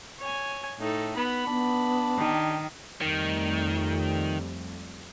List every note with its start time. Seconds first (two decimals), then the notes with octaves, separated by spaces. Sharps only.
0.20 C#5 G#5
0.80 A2 D#4 A4
1.17 B3 B5
1.47 B3 D4
2.18 D#3 G4
3.01 F2 D#3 G3 A3